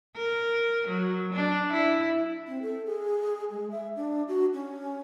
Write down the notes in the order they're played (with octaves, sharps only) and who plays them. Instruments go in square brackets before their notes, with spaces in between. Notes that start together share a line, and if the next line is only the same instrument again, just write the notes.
[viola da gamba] A#4
F#3
D4
E4
[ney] C4
A4
G#4
G#3
E5
D4
F#4
C#4